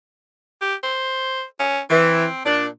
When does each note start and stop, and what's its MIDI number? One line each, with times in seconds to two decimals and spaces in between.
0.61 0.75 67
0.84 1.44 72
1.60 1.81 61
1.90 2.25 52
1.90 2.43 60
2.45 2.68 46
2.45 2.65 62